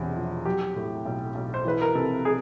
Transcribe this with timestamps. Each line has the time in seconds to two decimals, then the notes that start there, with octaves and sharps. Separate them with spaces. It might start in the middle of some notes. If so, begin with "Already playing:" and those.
Already playing: E1 E2 C3
0.15 F3
0.45 F#3 G4
0.76 A2
1.05 B1
1.35 B1
1.54 C5
1.65 E3 B4
1.81 A#4
1.95 C3 A4
2.25 G#4